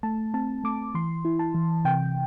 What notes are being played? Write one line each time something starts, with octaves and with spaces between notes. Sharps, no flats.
A3 A5
C4 A5
A3 D6
E3 C6
E4
A5
E3
C3 G5